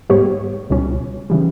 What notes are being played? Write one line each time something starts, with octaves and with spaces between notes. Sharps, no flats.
G#2 G3 B3 G4 C#5
C#2 B2 G3 C#4
C#3 E3 G3